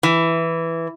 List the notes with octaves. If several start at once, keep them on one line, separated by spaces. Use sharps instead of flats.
E3